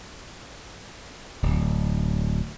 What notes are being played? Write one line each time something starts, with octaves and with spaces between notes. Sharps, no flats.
D1